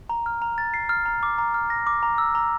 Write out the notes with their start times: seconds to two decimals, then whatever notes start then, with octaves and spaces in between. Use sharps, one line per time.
0.09 A#5
0.26 F6
0.42 A#5
0.58 A6
0.74 C7
0.89 F6
1.06 A#5
1.23 D6
1.38 A#5
1.54 F6
1.70 A#6
1.87 D6
2.03 A#5
2.18 E6
2.35 A#5